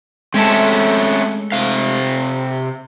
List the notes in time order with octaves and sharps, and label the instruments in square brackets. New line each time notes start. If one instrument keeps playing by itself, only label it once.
[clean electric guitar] G#3 A3 A4 [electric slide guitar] C4 C#4 E5
[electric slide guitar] C3 F5